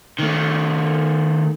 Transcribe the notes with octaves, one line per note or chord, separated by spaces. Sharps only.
D#3 A3